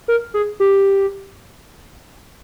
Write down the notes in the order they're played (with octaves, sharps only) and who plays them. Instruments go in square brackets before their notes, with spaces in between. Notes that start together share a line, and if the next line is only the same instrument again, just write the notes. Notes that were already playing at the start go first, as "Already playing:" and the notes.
[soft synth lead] A#4
G#4
G4